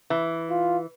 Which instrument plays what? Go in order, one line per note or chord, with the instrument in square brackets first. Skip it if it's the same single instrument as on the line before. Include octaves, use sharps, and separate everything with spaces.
[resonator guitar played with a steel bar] E3
[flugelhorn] F4